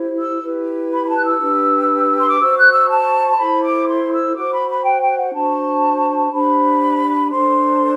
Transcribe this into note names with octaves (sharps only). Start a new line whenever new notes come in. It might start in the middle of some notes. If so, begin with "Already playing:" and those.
Already playing: E4 G4 C5
E6
E4 G4 B4
B5
B5
A5
F#6
E6
D4 G4 B4
C6
D6
F#4 C5 E6
F#6
E6
A5
C6
E4 A4 C5 B5
D6
C6
E6
F#4 C5 D6
B5
B5
G5
G5
F#5
D4 F#4 C5 A5
D4 G4 C5 B5
D4 A4 C5 C6